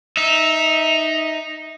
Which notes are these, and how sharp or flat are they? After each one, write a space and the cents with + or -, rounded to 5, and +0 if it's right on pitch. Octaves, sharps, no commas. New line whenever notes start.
D#4 +0 E5 -20